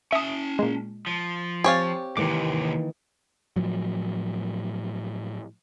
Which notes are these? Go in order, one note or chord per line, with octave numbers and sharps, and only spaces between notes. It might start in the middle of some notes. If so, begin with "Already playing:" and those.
C#4 E5 A5 D#6
A#2 G#3
F3
C4 G4 C#5 F5 G#5 A6
D#2 C3 D#3 E3 A#3 D6
A2 F3 F#3